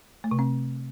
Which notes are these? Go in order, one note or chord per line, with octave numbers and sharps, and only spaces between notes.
A3
C3
C4